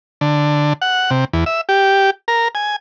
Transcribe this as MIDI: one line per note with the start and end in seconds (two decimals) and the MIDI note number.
0.21 0.73 50
0.82 1.10 78
1.11 1.25 48
1.33 1.44 40
1.46 1.61 76
1.69 2.10 67
2.28 2.48 70
2.55 2.76 80